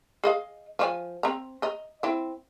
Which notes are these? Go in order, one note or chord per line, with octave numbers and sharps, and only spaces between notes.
G#4 D#5 F5
F3 C#5 G#5
C4 A#5
D#5 A#5
C4 E4